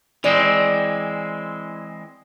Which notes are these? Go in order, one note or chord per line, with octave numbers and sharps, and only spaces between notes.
E3 G#3 C4 D5